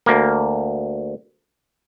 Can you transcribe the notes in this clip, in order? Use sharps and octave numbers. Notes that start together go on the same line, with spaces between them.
D2 A#3